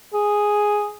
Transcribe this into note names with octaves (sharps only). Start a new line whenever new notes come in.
G#4